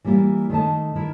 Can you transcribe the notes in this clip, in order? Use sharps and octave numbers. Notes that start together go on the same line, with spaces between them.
E3 G3 A#3 E4 F4
D#3 A3 D#5 A5
D#3 E4 A#4